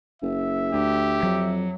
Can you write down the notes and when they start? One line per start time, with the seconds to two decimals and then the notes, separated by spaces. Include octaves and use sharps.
0.22 F#1 E5
0.72 D2 G4
1.23 F2 F#3